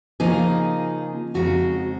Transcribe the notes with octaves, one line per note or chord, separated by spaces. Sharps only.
C#3 F3 A#3 D#4 G#4
F2 C#3 G#3 D#4 F#4